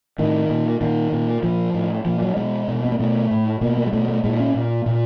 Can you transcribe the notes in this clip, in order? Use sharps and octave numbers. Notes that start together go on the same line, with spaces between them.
A2 D#3
A#2
A#2 D#3
A#2
A#2 F3
A2
A#2 F3
F#3
B2 G#3
B2
B3
A#3
B2 A3
A2
B2 A#3
A#3
G#3
B2 A3
A3
A#2 G#3
C#4
A#2
A#2